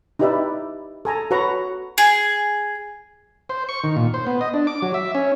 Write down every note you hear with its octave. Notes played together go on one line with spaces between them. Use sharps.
D#4 E4 G4 B4 D5 E5
A4 G#5 A#5
F#4 B4 C#5 F#5 A#5 C#6
G#4
C5
C#6
D#3
A#2
C5
B3
D#5
D4
D6
F#3
E5
C#4